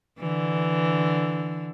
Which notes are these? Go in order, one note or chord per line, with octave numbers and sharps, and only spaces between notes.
D3 E3